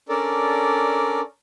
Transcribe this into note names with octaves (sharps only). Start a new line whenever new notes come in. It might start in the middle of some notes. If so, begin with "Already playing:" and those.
C#4 D4 A4 A#4 D5